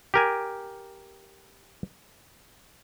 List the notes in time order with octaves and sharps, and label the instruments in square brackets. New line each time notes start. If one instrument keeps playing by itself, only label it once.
[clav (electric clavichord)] G4 A#4 G#5